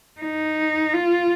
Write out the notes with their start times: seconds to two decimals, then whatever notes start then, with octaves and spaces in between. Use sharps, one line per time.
0.21 D#4
0.93 F4